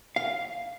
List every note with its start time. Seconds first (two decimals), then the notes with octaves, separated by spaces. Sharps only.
0.16 F5